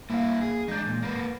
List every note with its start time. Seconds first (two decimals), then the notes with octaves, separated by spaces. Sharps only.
0.10 G2 A#3 E4 F5
0.41 G#4
0.68 E3 G#3 D4 D#4 G6
0.86 A#2
1.02 A#3 B4